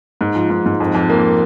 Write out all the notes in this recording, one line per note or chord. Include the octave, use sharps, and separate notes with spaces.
G#2
F3
G#2
G#2
F2
F2
A#3